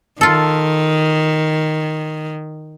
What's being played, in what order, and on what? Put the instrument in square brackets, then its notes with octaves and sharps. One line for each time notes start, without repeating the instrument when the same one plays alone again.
[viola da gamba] D#3 [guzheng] F4 A4